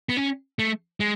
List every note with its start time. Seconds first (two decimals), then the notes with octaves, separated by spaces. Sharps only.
0.09 B3
0.17 C#4
0.59 A3
1.00 G#3